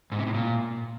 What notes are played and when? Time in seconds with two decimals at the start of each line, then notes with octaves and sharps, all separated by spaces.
0.12 G#2
0.19 C3
0.27 A2
0.34 A#2